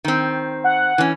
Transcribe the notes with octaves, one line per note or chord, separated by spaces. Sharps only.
D#3 C4
F#5
E3 C#4